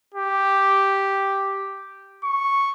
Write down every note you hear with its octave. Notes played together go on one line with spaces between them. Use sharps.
G4
C#6